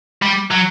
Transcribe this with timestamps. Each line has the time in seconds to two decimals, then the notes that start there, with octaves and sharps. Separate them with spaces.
0.22 G3
0.51 F#3